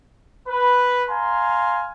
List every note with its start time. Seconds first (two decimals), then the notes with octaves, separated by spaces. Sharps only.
0.48 B4
1.10 F5 G#5 A#5 C6